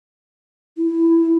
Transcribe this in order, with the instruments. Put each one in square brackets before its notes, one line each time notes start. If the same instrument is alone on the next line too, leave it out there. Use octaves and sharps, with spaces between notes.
[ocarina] E4